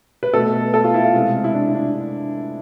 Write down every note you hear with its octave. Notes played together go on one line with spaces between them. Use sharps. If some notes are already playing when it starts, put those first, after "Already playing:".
B4
B2 A3 A4
A4
F4
E4
F4
C3 G#3
E4
D4
D4